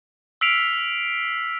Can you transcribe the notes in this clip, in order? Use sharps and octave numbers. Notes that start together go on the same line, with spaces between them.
E6 F6 B6 C7 D7 F7